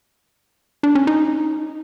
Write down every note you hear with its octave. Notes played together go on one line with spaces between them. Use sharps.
D4
C#4
D#4